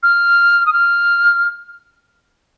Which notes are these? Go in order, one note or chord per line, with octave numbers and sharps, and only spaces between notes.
F6
D#6
F6